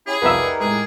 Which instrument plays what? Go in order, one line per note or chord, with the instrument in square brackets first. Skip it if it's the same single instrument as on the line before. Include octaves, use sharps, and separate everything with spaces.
[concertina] C#4 E4 G4 [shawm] G#4
[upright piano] C2 F2 F5 [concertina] D#4 G4 A#4 [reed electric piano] B4 E5
[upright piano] D5 F#5
[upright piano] A2 G#3 [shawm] G#4